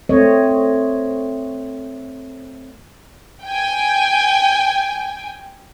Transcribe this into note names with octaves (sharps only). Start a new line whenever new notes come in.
A3 C4 C#5 D#5
G5 G#5